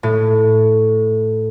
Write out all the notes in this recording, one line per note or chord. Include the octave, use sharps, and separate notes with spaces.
A2